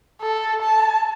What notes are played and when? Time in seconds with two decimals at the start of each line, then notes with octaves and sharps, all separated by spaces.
0.21 A4
0.62 A5